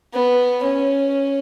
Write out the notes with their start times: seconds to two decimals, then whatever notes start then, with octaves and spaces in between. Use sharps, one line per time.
0.14 B3
0.63 C#4